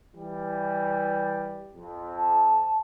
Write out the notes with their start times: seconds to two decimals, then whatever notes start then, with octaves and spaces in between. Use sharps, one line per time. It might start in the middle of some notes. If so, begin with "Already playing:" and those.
0.15 E3 G3
1.74 F2
2.16 A5